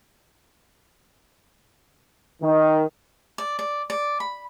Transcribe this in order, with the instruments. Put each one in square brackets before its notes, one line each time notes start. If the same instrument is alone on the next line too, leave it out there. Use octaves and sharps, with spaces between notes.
[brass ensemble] D#3
[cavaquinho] D5
D5
D5
B5